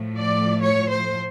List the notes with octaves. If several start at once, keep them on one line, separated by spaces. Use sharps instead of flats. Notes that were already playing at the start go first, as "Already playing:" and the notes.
Already playing: A2 F3 A3
D5
C#5
C5